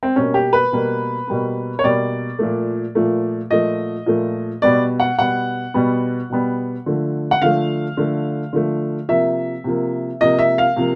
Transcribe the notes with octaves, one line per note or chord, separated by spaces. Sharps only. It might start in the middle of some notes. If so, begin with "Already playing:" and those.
C4
B2 G3 A#3 C#4
G4
B4
B2 G3 A#3
B2 G3 A#3
C#5
B2 G3 A#3 D5
A#2 F3 A3
A#2 F3 A3
A#2 F3 A3 D#5
A#2 F3 A3
B2 G3 B3 D5
F#5
B2 G3 B3 F#5
B2 G3 B3
B2 G3 B3
D3 F3 A3
F#5
D3 F3 A3 F5
D3 F3 A3
D3 F3 A3
C3 F3 A#3 E5
C3 F3 A#3
C3 F3 A#3 D#5
E5
F5
C3 F3 A#3